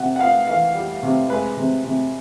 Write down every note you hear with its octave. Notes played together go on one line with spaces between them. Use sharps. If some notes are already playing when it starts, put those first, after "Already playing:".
Already playing: C3 F#5
F#5
B3 F5
E3 F5
G3
C3
G#3 B4
C3
C3